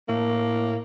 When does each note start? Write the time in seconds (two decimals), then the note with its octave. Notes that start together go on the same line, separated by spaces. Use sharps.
0.09 A2 A#3